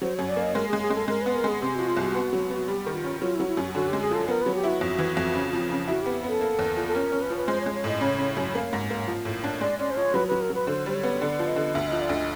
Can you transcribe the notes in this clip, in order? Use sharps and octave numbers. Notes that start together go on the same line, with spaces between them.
F#3 C5
F#2 C#5
D5
A#3
D#5
G#3 A#4
G#4
G#3
G#4
G#3 A4
G#3 A#4
B3 B4
A#4
G#3 G#4
C3 G4
F3 F#4
F4
C2
F#4
B3
F#3
B3
G3 G4
D#3
F4
C#4
F#3 F4
E4
F#3
E4
F#2 F#4
D3 F#4
G#3 G4
G#4
F3 A4
B3 A#4
F#3 B4
G4
E4 F#4
F2
E3
F2
C#3
F3
C#3
E4 F#4
B3 G4
B3 A4
A#3
E2
F3
A4
C#4 A#4
C#4
B4
F3
B4
G#3 C5
C#5
G#3
C#5
A2 D#5
C#3 C#5
C#3
F#2
A#3
G#2
A#3
F3
A2
D4
G#3 D5
C#4 D5
C5
F3 C#5
F#3 B4
F#3 B4
A#4
F#3 B4
D3 C5
G3 C5
C#5
B3
D3 D5
F3
D#5
D3
D2 E5
F3 D#5
D5
D2 D#5